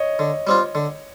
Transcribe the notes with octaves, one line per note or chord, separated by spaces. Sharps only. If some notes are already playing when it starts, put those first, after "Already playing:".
Already playing: C#5 D#5
D3
G3 C4 F4
D3